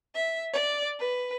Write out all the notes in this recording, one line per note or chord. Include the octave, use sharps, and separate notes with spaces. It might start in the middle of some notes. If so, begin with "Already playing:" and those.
E5
D5
B4